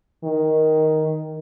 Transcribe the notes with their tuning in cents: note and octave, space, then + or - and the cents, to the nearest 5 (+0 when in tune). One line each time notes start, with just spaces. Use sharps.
D#3 +5